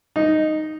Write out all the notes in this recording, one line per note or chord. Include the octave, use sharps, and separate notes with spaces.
D#4